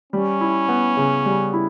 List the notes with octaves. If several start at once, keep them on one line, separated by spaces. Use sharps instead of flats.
G3 C#4
E4
B3
C#3
G3
E4